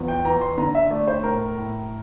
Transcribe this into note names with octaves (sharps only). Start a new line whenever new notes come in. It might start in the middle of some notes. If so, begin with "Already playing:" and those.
Already playing: E2 F3
G5
E3 A#5
C6
D3 A#5
E5
A3 D5
C5
A2 A#4
A2